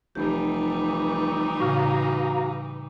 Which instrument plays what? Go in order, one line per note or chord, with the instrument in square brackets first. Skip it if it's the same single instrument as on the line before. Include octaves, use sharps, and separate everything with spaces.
[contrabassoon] F1 [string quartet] E3 G3 D#4 [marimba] G4
[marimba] A2 C#3 [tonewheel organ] F#4 F5 A#5